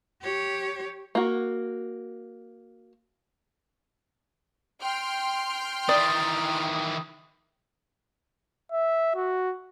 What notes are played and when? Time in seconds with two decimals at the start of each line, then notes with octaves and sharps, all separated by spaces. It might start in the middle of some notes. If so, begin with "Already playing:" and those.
0.22 G4 C#5
1.15 A#3 F#4
4.81 G5 C6 F6
5.89 D#3 E3 D5 D#6
8.72 E5
9.15 F#4